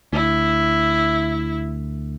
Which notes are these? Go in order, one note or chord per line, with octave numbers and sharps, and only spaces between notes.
D2 E4